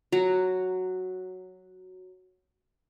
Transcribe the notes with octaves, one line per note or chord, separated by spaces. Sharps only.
F#3 F#4 A#5